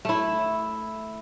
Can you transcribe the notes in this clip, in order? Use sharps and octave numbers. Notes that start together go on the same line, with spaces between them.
A3 E4